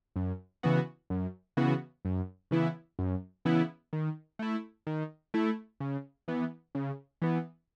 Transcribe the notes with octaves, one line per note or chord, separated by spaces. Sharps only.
F#2
C#3 E3 B3 F#4
F#2
C#3 E3 B3 F#4
F#2
C#3 E3 B3 E4
F#2
C#3 E3 B3 E4
D#3
A3 E4
D#3
A3 E4
C#3
E3 B3
C#3
E3 B3